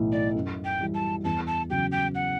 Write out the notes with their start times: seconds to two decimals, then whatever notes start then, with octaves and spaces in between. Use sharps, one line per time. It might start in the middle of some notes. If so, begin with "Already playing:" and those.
Already playing: B1 A2 E3
0.12 D5
0.34 F#2
0.65 G5
0.80 E3 G3
0.95 A5
1.24 E2 A5
1.47 A5
1.70 C#3 F#3 G5
1.92 G5
2.15 F#5